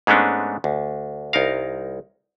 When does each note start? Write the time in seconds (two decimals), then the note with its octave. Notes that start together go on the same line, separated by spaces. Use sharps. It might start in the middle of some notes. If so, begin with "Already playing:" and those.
0.07 G#2 G#3 A3 B3 C#4 D4
0.64 D2
1.33 C2 D#4 A#4 F5